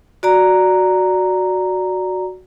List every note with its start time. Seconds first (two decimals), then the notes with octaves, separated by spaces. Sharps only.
0.23 F#4 D5 A#5